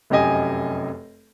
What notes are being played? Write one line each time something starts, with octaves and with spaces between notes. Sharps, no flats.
F1 F#2 G4 D#5 G#5